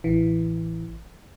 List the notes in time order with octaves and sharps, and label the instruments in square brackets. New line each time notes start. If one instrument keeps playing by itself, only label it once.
[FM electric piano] A1 E3